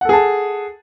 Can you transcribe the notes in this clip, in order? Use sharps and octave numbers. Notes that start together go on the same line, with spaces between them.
G#4 A4 F#5 A5